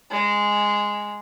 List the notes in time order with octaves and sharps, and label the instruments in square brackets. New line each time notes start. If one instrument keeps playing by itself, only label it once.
[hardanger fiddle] G#3